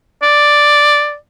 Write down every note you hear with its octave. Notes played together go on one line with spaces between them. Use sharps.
D5